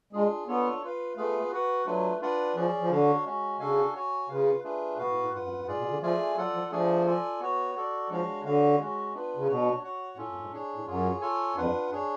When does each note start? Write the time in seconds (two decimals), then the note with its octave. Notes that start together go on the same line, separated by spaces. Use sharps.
0.13 G#3 D4 F4 G#4
0.48 B3 D4 F4 A4 C#5
0.83 F4 B4 F5
1.17 A3 B3 F4 G#4 B4 F5
1.52 F#4 B4 F#5
1.86 F#3 A3 D4 F4 B4
2.21 D4 F4 B4 D5 F#5
2.56 F3 C#4 G#4 D5
2.80 F3
2.90 D3 D4 F#4 C#5 F5
3.25 G#3 C#4 F#4
3.60 C#3 D4 F#4 A4 F5 G#5
3.94 F#4 C#5 G#5
4.29 C#3 F4 B4 F5
4.64 A3 D4 F4 G#4 B4
4.98 B2 B3 F#4 B4 F5
5.10 A2
5.21 A2
5.33 G#2 F4 B4 F#5
5.44 F#2
5.56 F#2
5.67 G#2 F4 G#4 D5
5.79 B2
5.90 D3
6.02 F3 A3 F4 G#4 D5 G#5
6.36 F#3 F4 A4 D5 F#5
6.54 F3
6.71 F3 A3 D4 G#4 D5 G#5
7.06 F4 A4 D5 G#5
7.40 B3 F#4 C#5
7.75 F#4 A4 D5
8.10 F3 G#3 D4 F#4 C#5 F5
8.44 D3 F#4 C#5 F5
8.79 G#3 C#4 F#4
9.14 B3 D4 F4 B4
9.37 C#3
9.48 B2 D4 F#4 C#5
9.83 F#4 C#5 F#5
10.17 A2 C#4 F4 A4
10.30 F#2
10.41 G#2
10.52 A2 D4 G#4 C#5
10.75 A2
10.87 F#2 F4 G#4 C#5
11.21 F4 A4 C#5 G#5
11.56 F2 D4 F4 B4 F#5
11.91 F#2 D4 G#4 C#5